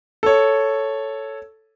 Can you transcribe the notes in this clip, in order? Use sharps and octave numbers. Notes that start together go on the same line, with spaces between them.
A4 C#5